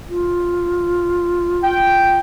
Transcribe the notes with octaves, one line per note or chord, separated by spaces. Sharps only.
F4
G5